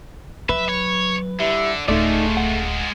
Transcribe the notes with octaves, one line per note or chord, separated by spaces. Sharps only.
F#3 B4 E5
C#5
D3 G3 E4 E5
D1 G#3 A3 D#4 F4 D5
F#5